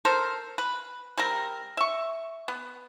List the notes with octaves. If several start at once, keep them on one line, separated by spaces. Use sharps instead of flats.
A4 A#4 C5
B4
G3 C4 A#4
E5 C#6
B3